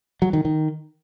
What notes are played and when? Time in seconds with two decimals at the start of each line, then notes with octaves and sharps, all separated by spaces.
0.22 F#3
0.33 D#3
0.45 D#3